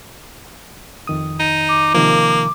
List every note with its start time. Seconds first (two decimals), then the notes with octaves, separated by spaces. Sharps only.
1.07 F2 D#3 D#6
1.39 D#4
1.69 D6
1.94 C3 D#3 F3 A#3